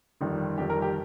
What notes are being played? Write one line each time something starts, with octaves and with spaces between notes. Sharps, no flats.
G1 F2 D#3 G3
G1 F2 D#3 G3 G4
A#4
G4